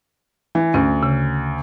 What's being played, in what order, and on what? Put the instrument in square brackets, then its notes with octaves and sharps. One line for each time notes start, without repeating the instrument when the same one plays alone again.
[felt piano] E3
[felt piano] D2 [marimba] C#4
[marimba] C#3